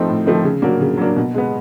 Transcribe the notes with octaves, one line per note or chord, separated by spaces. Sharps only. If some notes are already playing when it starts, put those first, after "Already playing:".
Already playing: F3 A3 C4 D#4
A2
F3 A3 C4 D#4
C#3
F#3 A#3 D4
C#3
F#3 A#3 D4
B2
G#3 B3